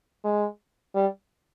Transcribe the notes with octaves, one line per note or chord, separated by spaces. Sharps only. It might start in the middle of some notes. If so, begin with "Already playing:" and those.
G#3
G3